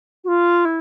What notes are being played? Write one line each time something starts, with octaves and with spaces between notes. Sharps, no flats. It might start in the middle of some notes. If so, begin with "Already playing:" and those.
F#4
F4
E4